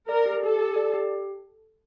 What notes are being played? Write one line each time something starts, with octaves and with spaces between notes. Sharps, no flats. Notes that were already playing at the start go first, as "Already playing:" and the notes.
A#4 D5
G4
G4 A4
G4
D5
G4